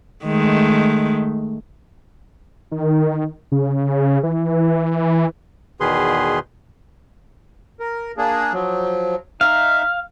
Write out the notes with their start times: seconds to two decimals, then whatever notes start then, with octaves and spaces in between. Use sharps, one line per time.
0.25 D#3 G#3 A3
2.72 D#3
3.52 C#3
4.23 E3
5.80 E2 B2 D#3 G#4 B4 C6
7.80 A#4
8.17 A#3 D4 G#4
8.53 F3 F#3
9.41 D#4 E5 F5